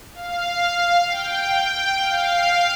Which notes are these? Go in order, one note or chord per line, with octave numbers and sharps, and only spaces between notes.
F5
G5
G5
F5